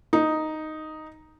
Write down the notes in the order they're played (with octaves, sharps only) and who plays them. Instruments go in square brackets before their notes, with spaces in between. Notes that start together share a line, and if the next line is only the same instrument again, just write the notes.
[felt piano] D#4